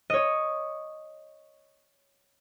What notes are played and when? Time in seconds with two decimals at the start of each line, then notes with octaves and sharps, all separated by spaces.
0.10 C#5 D#5